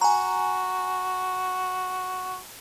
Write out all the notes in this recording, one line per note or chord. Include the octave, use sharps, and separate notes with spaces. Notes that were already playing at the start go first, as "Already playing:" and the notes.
F#4 G#5 A#5